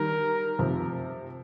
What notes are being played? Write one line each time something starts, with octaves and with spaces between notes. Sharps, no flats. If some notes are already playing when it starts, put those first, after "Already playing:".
Already playing: D#3 G3 A#4
C3 F3